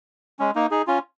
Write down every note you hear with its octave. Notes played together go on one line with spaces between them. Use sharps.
G#3 C#4
A#3 D#4
D#4 G#4
C#4 F4